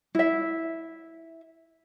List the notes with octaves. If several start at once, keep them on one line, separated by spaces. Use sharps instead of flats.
E4 E5